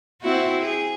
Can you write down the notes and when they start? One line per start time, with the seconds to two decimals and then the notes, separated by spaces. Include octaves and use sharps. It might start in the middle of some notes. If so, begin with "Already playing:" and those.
0.22 C4 E4 F#4
0.61 G#4